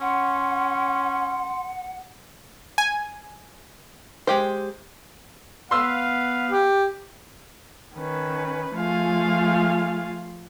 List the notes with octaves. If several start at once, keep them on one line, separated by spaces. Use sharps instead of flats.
C#4 F#5 C6
G#5
G#3 G4 C5
B3 B4 F5 C6 E6
G4
D#3 C#4 B4
F3 A3 F4 G#4 F5